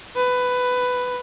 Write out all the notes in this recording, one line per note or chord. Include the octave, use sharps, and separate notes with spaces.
B4